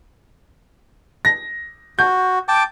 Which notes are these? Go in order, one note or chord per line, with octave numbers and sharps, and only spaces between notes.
A#6
F#4 G6
G5 A5 D6